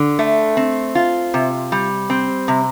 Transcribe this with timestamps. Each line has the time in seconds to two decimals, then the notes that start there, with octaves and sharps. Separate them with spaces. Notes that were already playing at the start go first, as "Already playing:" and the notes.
Already playing: D3
0.19 A3
0.57 C4
0.95 F4
1.34 C3
1.72 G3
2.10 C4
2.48 C3